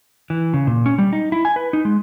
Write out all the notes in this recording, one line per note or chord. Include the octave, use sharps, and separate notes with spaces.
E3
C#3
A#2
C#4
G3
D#4
E4
G#5
B4
D#4
G#3